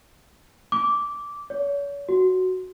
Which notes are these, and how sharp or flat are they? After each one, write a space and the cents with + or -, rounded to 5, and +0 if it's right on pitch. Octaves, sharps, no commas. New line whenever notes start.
D6 -10
C#5 +40
F#4 +5